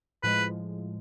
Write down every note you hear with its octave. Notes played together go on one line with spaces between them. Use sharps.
A2 F3 G#3 B4